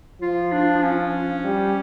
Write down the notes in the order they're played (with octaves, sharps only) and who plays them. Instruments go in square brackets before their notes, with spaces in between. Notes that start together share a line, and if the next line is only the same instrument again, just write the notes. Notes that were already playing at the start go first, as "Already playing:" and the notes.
[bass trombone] F3 [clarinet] F4
[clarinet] D4
C#4
[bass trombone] G3